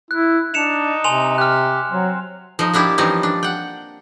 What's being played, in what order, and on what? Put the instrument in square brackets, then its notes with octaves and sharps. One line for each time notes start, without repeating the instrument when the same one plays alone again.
[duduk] E4 [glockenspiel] F#6
[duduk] D4 [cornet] D#4 [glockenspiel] C#7 E7 F7
[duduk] C3 [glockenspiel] G#5 C6 F7
[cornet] G4 [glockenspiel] F6 F#6
[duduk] F#3 [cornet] C4
[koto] F3 D#4
A#3 D4 E4 G4
E3 F3 G3 C4 C#4 D#4
D4
F#5 G5